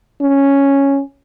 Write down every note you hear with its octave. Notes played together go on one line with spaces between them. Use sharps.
C#4